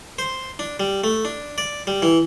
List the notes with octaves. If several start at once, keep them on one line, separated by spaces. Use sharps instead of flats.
C5
D4
G3
A3
D4
D5
G3
E3